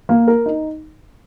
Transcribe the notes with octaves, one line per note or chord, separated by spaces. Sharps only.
A#3
A#4
D#4